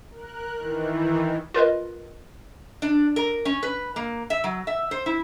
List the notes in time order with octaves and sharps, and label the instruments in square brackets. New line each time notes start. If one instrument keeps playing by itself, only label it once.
[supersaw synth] A#4 F#6
D#3 E3
[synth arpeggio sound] F4 A#4 B4 D#5
[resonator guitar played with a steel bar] D4
A#4
C#4
B4
A#3
E5
F#3
E5
C5
E4